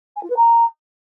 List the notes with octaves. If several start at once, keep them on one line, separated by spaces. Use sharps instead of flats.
G#5
F4
B4
A#5